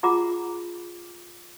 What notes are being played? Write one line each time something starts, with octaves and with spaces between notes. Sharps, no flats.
F4 G#4 F#5 A#5 D6